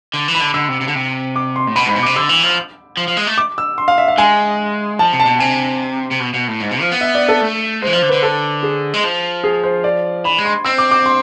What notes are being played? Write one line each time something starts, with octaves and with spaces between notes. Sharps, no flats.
D3
E3
B5
D3
D3 E6
C3
C3
D3
C3
D6
C6
A2
B2 B5
G#2 B5
B2
D6
C3
D3 E6
E3
F3
F3
F3
G#3
A3
D6
E6
C6
F5
E5
F5
G#3 G#5
F3 A5
C3
A5
B2
C3 G#5
C3
B2
B2
A2
G#2
B2
F3
B3
E5
D5
A4
A3
G#3 C5
E3
F3 C5
D3
B4
D3
A4
G#4
G#3
F3
G#4
C5
D5
E3 B5
G#3
C6
C4 E6
D6
D6
C6